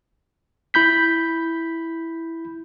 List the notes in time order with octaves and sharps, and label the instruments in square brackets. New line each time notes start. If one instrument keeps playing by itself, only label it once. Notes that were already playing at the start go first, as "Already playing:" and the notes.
[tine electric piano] E4 B5 G6 B6